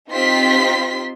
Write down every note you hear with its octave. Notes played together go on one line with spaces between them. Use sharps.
C4 D#4 F4 G4 C6 B6